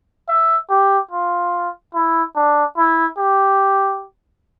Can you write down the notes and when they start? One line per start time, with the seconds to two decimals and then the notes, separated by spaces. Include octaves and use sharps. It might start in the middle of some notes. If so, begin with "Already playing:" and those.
0.28 E5
0.70 G4
1.11 F4
1.94 E4
2.36 D4
2.77 E4
3.18 G4